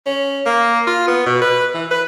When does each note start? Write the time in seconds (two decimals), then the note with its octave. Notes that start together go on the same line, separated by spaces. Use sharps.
0.06 C#4
0.46 A#3
0.87 F4
1.07 B3
1.26 B2
1.42 B4
1.74 E3
1.91 B4